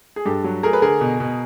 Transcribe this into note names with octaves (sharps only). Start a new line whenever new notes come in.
G#4
G2 G4 A4
F#3
A3 G#4 A#4
B4
D3 G#4 A#4
B2
B2